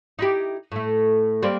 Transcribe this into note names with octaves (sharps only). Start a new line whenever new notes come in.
D#4 E4 G4
A2 A3
G3 A#3 C4